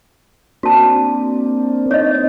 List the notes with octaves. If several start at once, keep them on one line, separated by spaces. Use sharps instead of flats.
A#3 C4 D4 F#4 A5
C4 D#4 C#5 D#5